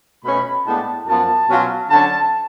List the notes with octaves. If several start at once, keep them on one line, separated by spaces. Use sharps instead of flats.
B2 A3 C#4 B5
A2 G#3 B3 D4 A5
F#2 F3 B3 F4 A5
B2 F#3 C#4 F4
D3 F#3 C#4 A5